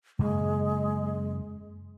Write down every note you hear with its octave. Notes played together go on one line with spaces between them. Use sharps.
F#2 C#3 G#3 A#3